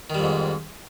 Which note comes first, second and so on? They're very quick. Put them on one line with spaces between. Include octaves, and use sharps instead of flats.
D#3 G3 F2 G#2